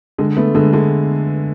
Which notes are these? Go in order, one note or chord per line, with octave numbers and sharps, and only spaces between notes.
D3 G#3
A3 B3
D3 G#3
D3 G#3